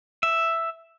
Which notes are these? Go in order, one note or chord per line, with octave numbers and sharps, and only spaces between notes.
E5